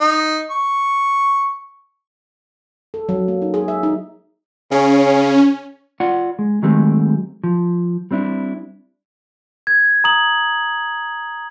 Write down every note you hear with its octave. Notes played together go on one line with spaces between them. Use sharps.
D#4
C#6
A4
F#3
A#3
D#4
G#4
E5
D#4
C#3 C#4
F4 D5 F#5
G#3
D#3 F#3 G#3 A3 C4 G4
F3
G3 C4 D4 E4
G#6
A#5 D#6 F#7